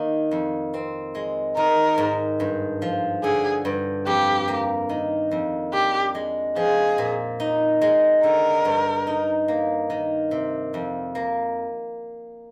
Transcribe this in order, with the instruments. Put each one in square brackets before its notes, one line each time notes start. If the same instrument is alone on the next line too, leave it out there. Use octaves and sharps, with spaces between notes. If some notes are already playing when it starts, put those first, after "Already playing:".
Already playing: [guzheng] D#3 A#3
F2
C4
G#3
[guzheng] D#3 [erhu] A#4
[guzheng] G#2
G2
F3
[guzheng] D3 [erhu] G#4
[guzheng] G2
[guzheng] F2 [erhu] G4
[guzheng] A#3
D#3
F2
[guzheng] D4 [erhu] G4
[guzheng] G#3
[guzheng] F3 [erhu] G#4
[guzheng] A#2
D#4
G#3
[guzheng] D3 [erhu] A#4
[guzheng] G2
D#4
A#3
D#3
C3
F2
A#3